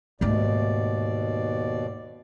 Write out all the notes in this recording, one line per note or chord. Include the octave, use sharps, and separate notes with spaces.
D#2 G#2 B2 A3 D5